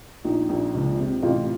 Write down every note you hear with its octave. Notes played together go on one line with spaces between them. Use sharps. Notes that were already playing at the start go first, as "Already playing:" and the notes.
A#1 D#4
A#1
C#2
C3
A1 F4